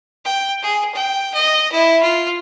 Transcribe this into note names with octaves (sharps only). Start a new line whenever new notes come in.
G5
G#4
G5
D#5
E4
F4